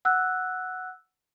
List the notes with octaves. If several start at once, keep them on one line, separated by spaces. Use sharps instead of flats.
F#5 E6 F#6